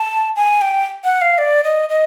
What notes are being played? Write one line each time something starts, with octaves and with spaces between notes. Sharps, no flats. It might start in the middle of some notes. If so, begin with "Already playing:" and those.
Already playing: A5
G#5
G5
F#5
F5
D5
D#5
D#5